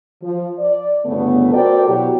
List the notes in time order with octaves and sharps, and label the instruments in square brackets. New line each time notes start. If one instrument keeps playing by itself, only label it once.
[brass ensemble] F3
D5
G1 C#3 A3 B3
F#4 A4 A#4 C5 D5 G5
B2 F#3 E4 F#4 G4